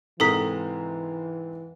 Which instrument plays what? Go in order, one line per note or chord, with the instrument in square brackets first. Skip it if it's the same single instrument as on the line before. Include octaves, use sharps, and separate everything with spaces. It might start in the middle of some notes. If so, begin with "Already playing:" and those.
[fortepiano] G#2 C3 A#4 [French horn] E3 [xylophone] A4 D#6 B6